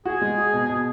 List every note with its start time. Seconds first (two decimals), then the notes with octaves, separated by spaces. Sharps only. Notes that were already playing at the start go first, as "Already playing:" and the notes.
0.06 F#4 G#4
0.22 G#3
0.37 F#4
0.53 B2
0.70 B2